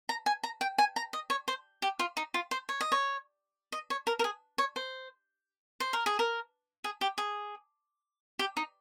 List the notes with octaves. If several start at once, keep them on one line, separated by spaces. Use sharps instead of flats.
A#5
G#5
A#5
G5
G#5
A#5
D#5
C#5
C5
G4
F4
D#4
F4
C5
C#5
D#5
C#5
D#5
C#5
A#4
A#4
G#4
C#5
C5
C5
A#4
G#4
A#4
G#4
G4
G#4
G4
D#4